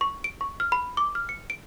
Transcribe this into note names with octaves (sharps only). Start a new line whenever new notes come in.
C#6
D7
C#6
F6
B5
D6
F6
C#7
D7